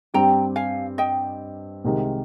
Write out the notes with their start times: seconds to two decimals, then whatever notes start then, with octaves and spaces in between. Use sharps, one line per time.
0.14 G2 G3 C4 G4 G5 A#5
0.56 F5 G#5
0.98 D#5 G5
1.84 C2 C3 D#3 G#3 D#4